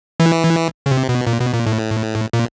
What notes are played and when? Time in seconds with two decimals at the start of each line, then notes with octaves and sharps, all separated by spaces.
0.20 E3
0.86 C#3
0.91 C3
1.09 B2
1.27 A#2
1.40 B2
1.53 A#2
1.66 A2
2.33 A#2